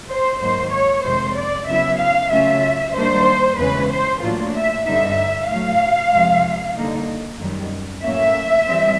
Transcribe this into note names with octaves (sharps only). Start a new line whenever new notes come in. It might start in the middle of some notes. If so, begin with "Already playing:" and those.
C5
G#2 D#3 F#3 A#3 C5
C#5
F2 C3 D#3 G#3 C5
D5
C#3 F#3 B3 E4 E5
F5
C#3 F#3 A3 C#4 F4 E5
D#3 G3 A#3 D4 C5
E2 C#3 E3 G#3 C#4 B4
C5
A2 F#3 A#3 D4 F4
E5
G2 D3 G3 B3 D#4 E5
A2 F#3 A3 F5
F2 C3 F3 G#3
D3 G3 A#3 D#4
F#2 D#3 G3
A2 F#3 A#3 C#4 E5
E3 G3 C4